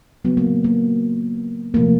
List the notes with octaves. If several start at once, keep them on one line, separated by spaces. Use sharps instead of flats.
C#3 F#3 A#3 B3
A#3
A#3
C3 F3 A3 A#3